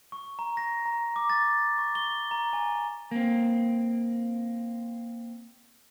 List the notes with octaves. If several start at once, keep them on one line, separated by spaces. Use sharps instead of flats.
C#6
A#5
A#6
A#5
D6
A6
C#6
G7
A#5
G#5
A#3 C4